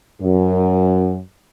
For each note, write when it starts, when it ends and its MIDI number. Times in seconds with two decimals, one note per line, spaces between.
0.21 1.18 42